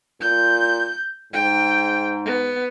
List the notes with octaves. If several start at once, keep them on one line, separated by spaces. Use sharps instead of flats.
A#2 G6
G#2 G5
B3